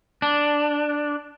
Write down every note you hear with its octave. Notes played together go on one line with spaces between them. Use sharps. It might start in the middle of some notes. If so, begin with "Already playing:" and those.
D4